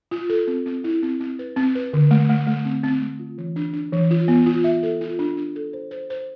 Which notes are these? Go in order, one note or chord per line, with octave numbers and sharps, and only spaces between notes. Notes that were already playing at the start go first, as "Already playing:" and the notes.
F4
A4
C4
C4
E4
C4
C4
B4
C4
B4
D3
A3
A3
A3
C4
C4
A3
F4
E3
D4
D4
E3
F4
B3
F4
E5
A4
F4
D4
D4
A4
C5
C5
C5